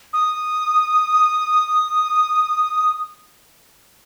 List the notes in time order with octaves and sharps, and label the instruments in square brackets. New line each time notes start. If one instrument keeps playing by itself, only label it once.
[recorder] D#6